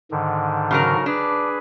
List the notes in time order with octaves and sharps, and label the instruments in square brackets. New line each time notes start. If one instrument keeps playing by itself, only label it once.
[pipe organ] G#2 D3 D#3
[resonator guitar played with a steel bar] C#3 F#3 A#4
[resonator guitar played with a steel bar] D4 [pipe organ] G#4 B4